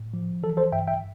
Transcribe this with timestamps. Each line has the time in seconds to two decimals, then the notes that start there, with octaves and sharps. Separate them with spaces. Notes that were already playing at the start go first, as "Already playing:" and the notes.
Already playing: A2
0.14 F3
0.43 E3 A4
0.57 A4 C5
0.72 G2 E5 G5
0.88 E5 G5